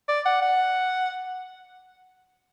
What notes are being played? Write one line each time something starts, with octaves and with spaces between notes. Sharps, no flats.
D5
F#5
F#5